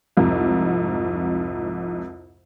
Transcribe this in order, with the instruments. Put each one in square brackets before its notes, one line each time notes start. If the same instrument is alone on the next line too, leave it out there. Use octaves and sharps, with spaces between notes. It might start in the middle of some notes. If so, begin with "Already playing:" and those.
[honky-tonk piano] C2 F2 G#2